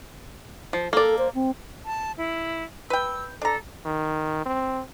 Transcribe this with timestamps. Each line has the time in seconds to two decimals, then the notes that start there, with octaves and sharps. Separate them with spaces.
0.73 F3
0.93 A#3 A4 D5
1.18 C5
1.34 C4
1.85 A5
2.18 E4
2.90 B4 G5 E6
3.42 D4 A4 A#5
3.86 D#3
4.46 C4